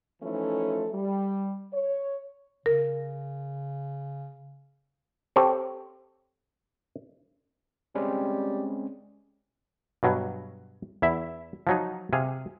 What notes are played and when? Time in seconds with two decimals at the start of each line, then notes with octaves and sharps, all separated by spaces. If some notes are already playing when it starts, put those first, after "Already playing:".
0.22 E3 F3 A3 C#4 D#4 A4
0.94 G3
1.73 C#5
2.66 C#3 A#4
5.36 C4 G4 A4 C5 C#5 F5
7.95 G3 G#3 C4 C#4
10.03 G2 B2 F#3
11.02 E2 E4 E5
11.67 F3 F#3 D#4
12.13 C3 G#4 F5